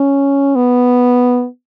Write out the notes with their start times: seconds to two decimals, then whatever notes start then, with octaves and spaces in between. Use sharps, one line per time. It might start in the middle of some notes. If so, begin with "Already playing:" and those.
Already playing: C#4
0.56 B3